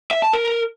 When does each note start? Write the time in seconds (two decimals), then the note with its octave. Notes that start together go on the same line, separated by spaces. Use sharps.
0.11 E5
0.22 A5
0.33 A#4